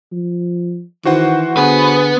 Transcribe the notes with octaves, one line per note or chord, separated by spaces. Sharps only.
F3
D#3 E3 F#4 C5 F#5
D3 B3 G#4 B4